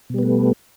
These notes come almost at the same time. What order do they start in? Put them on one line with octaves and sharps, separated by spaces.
B2 G3 B3 A3